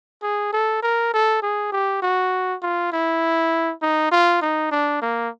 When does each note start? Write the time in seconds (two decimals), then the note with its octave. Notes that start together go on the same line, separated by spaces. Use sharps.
0.22 G#4
0.53 A4
0.82 A#4
1.13 A4
1.42 G#4
1.72 G4
2.02 F#4
2.62 F4
2.92 E4
3.82 D#4
4.12 F4
4.42 D#4
4.71 D4
5.02 A#3